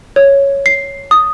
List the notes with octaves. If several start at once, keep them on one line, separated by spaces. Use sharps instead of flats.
C#5
C7
D#6